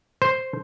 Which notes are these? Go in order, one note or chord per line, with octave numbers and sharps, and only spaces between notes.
C5